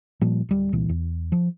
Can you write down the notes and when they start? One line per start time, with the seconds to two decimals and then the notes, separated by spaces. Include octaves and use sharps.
0.21 A#2 F3 G3
0.49 D1 G3
0.72 C2 A#2 E3
0.89 E2
1.32 F3